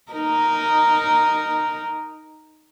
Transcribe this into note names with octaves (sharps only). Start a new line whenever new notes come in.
D#4 A#4